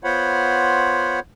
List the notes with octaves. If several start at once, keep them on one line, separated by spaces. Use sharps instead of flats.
B3 F4 C5 C#5 F#5 B5